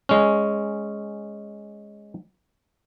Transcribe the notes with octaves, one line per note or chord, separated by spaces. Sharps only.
G#3 C#4